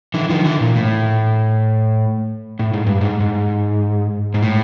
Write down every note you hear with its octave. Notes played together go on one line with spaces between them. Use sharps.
D3 E3
D#3 F3
D3 E3
A#2
A2
A2
G#2
G2
G#2
G#2
G#2
A2